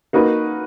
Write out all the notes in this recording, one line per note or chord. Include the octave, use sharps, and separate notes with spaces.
A#3 D#4 F#4 B4